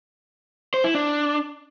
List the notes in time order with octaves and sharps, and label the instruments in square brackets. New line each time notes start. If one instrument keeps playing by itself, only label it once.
[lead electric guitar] C5
E4
D4